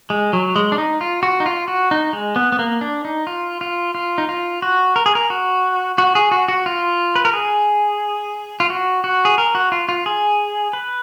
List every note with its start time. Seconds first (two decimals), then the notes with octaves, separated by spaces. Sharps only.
0.10 G#3
0.33 F#3
0.56 G#3
0.72 D4
0.78 D#4
1.01 F4
1.23 F#4
1.40 D#4
1.46 F4
1.68 F#4
1.91 D#4
2.13 G#3
2.36 B3
2.52 B3
2.59 A#3
2.81 D4
3.05 D#4
3.27 F4
3.61 F4
3.95 F4
4.18 D#4
4.29 F4
4.62 F#4
4.96 A#4
5.06 G#4
5.15 A#4
5.30 F#4
5.98 F#4
6.15 G#4
6.31 F#4
6.48 F#4
6.66 F4
7.16 B4
7.25 A#4
7.33 G#4
8.60 F4
8.70 F#4
9.04 F#4
9.25 G#4
9.38 A#4
9.55 F#4
9.72 F4
9.89 F4
10.06 G#4
10.73 B4